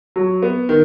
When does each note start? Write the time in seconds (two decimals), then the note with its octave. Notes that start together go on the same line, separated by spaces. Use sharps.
0.16 F#3
0.43 B3
0.69 D#3